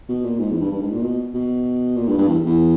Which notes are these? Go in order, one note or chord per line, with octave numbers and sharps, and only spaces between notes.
B2
A#2
G#2
E2
G2
G2
G#2
A#2
B2
B2
A#2
G2
G2
E2
E2